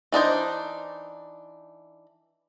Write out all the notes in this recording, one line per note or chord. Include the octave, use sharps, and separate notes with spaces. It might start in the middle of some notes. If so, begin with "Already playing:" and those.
E3 D4 D#4 C5